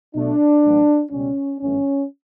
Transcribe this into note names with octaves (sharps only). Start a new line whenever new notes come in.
B1 B2 A3 D4
A1 A2 F#3 B3
C#2 B2 G3 C#4
G1 F#2 E3 A3 C#4